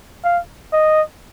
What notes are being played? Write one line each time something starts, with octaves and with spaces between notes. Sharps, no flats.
F5
D#5